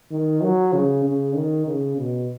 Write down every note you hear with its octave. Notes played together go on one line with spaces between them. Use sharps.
D#3
F#3
C#3
C#3
D#3
C#3
B2